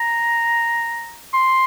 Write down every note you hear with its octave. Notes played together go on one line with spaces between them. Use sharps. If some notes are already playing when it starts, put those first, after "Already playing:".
Already playing: A#5
C6